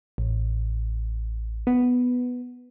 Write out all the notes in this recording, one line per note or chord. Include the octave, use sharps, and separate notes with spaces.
A1
B3